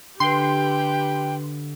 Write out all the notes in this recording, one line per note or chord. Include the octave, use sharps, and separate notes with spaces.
D3 G4 B4 G5 C6